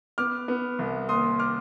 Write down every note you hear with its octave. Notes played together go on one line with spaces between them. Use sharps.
B3 D6 F6
B3
C2
D#2 C6 D#6
D6 F6